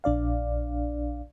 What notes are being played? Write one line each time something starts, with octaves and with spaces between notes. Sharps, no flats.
A#1 D4 D5 F5